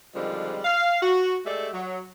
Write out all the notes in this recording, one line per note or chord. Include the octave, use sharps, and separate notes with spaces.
D3 D#3 F3 G3 G#3 C4
F5
F#4
G#3 A3 G4 A4 D5 E5
F#3